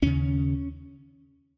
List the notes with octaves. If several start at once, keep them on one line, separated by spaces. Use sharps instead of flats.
D#2 C#3 C#4